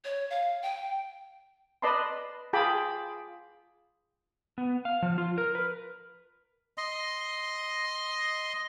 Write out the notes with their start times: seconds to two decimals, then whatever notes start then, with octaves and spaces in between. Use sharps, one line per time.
0.04 C#5
0.30 F5
0.62 G5
1.82 B4 D5 D#5 A5 B5 C6
2.53 F4 G#4 G5 A5 B5 D6
4.58 B3
4.85 F5
5.02 F3
5.18 F4
5.38 A#4
5.55 B4
6.78 D#5 C6